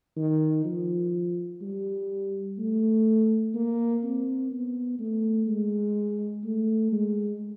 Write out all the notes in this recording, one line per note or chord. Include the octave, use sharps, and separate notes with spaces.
D#3
F3
G3
A3
A#3
C4
B3
A3
G#3
A3
G#3